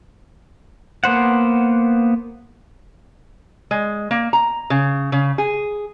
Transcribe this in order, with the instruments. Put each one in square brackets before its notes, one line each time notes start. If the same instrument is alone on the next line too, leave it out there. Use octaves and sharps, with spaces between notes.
[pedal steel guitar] A#3 B3 C5 F#5
[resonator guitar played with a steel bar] G#3
A#3
A#5
C#3
C#3
G#4